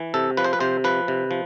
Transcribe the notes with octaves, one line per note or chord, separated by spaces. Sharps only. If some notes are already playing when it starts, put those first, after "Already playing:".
Already playing: E3
C3 A4
F3 B4
C5
B4
C3 C5
F3 B4
C3
F3